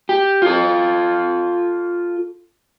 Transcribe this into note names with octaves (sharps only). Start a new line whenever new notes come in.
G4
F4 A4